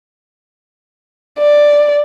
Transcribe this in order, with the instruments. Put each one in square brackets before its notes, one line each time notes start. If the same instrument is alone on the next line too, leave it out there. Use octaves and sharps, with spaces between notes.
[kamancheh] D5